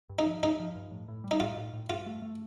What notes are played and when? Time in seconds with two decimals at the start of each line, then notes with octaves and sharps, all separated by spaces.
0.09 G2
0.19 D#4
0.26 F3
0.43 G2 D#4
0.60 F3
0.75 G2
0.91 A2
1.08 A2
1.24 G3
1.31 D#4
1.40 A2 F4
1.56 A2
1.73 A2
1.89 G2 F4
2.06 A3
2.22 A3